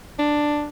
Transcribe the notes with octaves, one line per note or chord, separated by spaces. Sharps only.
D4